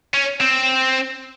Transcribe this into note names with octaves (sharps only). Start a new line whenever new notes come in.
C#4
C4